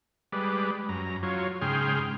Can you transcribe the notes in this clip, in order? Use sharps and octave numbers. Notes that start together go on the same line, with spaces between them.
G3 G#3 B4 D5
F#2 A#5
F#3 F4 C#5
G#2 C#3 G#4 G5 C6 F6